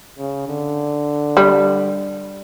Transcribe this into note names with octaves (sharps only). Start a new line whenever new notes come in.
C#3
D3
G3